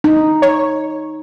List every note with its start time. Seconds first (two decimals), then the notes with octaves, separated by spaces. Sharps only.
0.04 D#4
0.42 C#5